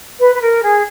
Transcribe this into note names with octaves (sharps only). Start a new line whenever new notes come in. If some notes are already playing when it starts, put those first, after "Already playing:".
B4
B4
A#4
G#4